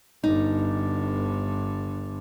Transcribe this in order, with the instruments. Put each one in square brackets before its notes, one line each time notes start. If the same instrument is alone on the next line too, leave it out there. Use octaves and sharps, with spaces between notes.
[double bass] G1 D3 [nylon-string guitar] D#4